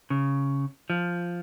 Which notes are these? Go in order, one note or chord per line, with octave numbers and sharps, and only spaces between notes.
C#3
F3